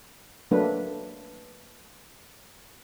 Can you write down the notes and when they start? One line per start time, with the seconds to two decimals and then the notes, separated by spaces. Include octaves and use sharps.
0.51 F#3 A3 A#3 D4 B4